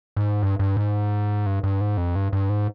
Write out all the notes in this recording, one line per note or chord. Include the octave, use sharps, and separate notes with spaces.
G#2
G2
G2
G#2
G2
G2
G#2
F2
G2
G2
G#2